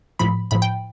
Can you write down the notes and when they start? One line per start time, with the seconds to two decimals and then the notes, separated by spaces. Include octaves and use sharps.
0.19 A2 F3 B5
0.51 A2 F3 B5
0.62 G5